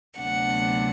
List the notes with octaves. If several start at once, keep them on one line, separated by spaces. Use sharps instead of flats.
D2 C3 F#3 B3 D4 F#5